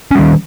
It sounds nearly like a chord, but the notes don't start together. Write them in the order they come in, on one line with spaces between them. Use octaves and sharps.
C#4 G3 D#3